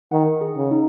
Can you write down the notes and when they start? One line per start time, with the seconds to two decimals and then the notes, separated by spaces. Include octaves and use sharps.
0.12 D#3 F#5
0.41 G#4
0.57 C#3
0.71 D#4